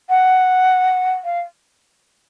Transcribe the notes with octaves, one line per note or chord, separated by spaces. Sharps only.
F#5
F5